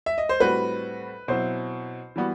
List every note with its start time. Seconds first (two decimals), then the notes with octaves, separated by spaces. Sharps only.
0.06 E5
0.18 D#5
0.29 C5
0.40 A2 G3 C4 F#4 B4
1.28 B2 F#3 C4 E4 C5
2.16 E3 G3 B3 F#4